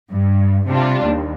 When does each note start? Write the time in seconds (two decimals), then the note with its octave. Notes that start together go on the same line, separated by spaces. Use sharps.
0.11 G2
0.68 C3 G3 D4 F4
1.05 D#2